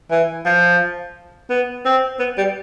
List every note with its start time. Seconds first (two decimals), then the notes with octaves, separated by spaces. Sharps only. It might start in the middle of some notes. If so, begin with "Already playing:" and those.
0.11 E3
0.45 F3
1.50 B3
1.85 C4
2.19 B3
2.37 G3